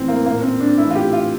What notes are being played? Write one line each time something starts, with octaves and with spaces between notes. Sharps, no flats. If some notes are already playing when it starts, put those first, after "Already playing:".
Already playing: A2 E3 C4
A#3
A#2 A#3
C4
D4
A2 E3 E4
F4
G4
F4